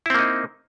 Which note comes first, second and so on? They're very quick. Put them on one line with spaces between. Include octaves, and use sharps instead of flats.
E4 C4 A#3 D#4